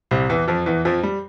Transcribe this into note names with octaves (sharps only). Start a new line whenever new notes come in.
C2 C3
E2 E3
F2 F3
E2 E3
F2 F3
G3